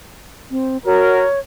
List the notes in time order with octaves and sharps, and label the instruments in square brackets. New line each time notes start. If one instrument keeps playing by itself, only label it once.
[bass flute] C4
[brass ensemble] F#4 A#4 [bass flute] C#5